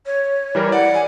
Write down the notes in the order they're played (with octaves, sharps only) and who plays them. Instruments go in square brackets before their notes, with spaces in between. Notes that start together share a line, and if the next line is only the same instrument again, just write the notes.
[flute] C#5
[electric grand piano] E3 G3 A#4
[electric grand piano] D5 [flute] F#5
[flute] G#5